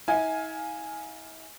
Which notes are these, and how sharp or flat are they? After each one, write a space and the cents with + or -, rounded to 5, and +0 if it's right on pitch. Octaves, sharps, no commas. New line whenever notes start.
E4 -45 F5 +10 G#5 +0